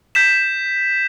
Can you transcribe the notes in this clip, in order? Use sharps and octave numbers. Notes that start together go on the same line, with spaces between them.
G6 B6 E7